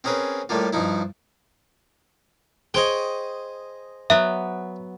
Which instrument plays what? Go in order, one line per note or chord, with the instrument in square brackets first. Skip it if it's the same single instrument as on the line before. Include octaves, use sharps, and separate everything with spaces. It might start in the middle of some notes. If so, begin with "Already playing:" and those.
[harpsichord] C4 C#4 G#4 A#4 B4
A2 G3 A3 A#3 F4
G2 F3 D#4 E4
[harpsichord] G#4 C5 D#5 [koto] C#5 G5
[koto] F#3 B3 [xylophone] E5